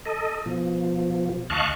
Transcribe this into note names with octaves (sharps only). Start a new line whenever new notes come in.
A4 D#5
B2 F3
D2 D#5 F5 A5 C#6 F#6